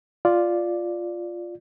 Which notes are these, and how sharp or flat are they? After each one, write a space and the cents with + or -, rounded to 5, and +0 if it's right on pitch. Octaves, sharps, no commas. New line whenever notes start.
F4 +0 D5 +0